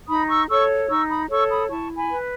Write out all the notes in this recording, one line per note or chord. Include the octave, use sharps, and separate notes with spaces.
D#4 B5 D#6
C#6 E6
A4 C#5 C#6 E6
D#4 C#6 E6
B5 D#6
A4 C#5 C#6 E6
B5 D#6
E4 A5 C#6
G#5 B5
B4